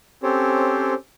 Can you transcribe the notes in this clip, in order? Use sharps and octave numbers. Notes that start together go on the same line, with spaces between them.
C4 C#4 G4 A4 C5 C#5